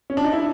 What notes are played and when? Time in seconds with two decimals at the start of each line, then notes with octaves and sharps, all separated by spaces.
0.10 C#4
0.17 D4
0.24 D#4
0.33 E4